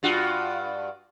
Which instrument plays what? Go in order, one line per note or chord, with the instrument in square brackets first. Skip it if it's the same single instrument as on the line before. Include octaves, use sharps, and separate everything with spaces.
[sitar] G2 F4 F#4